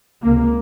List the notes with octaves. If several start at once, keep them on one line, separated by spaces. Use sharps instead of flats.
C#2 C3 A#3